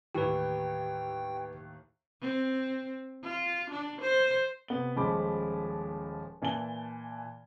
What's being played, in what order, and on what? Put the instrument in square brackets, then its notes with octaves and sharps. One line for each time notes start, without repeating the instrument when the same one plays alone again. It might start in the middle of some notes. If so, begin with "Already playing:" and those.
[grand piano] D#2 A2 E3 [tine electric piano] G4 B4 [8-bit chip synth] G5
[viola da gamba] C4
F4
D4
C5
[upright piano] C3 B3 G7
D#1 F3 G#3 B5 D6
A#2 E3 G#5 A5 G7